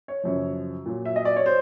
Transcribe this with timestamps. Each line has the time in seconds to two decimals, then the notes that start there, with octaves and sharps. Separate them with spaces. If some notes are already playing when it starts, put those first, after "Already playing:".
0.08 C#5
0.23 F#2 C#3 F3
0.85 A#2 F#3
1.05 E5
1.16 D#5
1.25 D5
1.36 C#5
1.46 C5